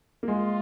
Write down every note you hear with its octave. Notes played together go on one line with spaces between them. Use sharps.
A#3
G#3 F4